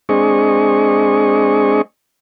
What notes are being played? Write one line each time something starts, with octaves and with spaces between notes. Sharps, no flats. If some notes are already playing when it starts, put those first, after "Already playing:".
G#3 C4 D4 G#4 D#5 C#6